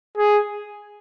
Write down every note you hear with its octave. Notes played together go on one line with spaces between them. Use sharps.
G#4